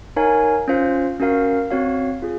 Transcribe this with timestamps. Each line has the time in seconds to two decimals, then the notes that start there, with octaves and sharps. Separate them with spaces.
0.16 D#4 A#4 C#5 F5 G#5
0.68 C#4 F4 C5 F5
1.20 C#4 F#4 A#4 F5
1.71 C4 F#4 C#5 F5
2.23 F4 G#4